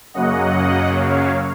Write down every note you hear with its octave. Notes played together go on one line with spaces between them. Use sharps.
F#2 C#3 F#3 A#3 D#5 F#5
C#5 F5